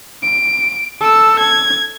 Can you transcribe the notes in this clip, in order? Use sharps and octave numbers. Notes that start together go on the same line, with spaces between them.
D7
A4 E6
G#6